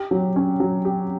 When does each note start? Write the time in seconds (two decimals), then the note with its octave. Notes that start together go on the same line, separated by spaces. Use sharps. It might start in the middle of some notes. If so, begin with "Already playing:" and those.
Already playing: G4
0.11 F#3
0.36 C#4
0.60 F#3
0.85 G4